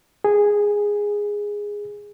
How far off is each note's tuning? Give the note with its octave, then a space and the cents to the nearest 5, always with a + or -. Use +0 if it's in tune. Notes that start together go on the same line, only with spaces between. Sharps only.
G#4 -10